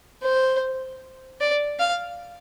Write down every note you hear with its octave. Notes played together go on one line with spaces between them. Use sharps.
C5
D5
F5